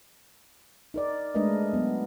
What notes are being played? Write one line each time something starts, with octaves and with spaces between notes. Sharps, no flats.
D#4 A#4 D5
G#3 A3 D4 A#4 B4 D#5
F#3 B3